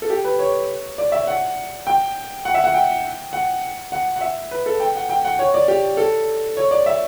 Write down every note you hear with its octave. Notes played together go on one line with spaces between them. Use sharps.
A4
G4
B4
C#5
D5
E5
F#5
G5
F#5
E5
F#5
G5
F#5
F#5
F#5
E5
B4
A4
G5
F#5
G5
F#5
C#5
D5
G4
A4
C#5
D5
E5